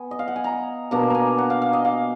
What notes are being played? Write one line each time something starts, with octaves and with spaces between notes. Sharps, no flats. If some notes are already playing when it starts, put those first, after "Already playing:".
Already playing: B3 G#5
D#5
F5
F#5
G#5
A#5
B2 A#3 D4 A#5
G#5 A#5
F#5
F5
F5
D#5
F5